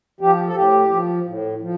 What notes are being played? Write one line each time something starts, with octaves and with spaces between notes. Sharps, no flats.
F3 G4
A4
A2 G4
F3
A2
F3